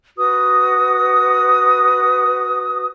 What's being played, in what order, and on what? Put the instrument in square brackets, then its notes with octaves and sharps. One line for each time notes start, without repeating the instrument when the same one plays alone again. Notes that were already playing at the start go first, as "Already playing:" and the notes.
[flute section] F#4 B4 D#6